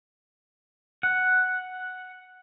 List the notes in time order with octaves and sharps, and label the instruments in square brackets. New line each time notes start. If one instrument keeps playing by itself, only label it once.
[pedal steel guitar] F#5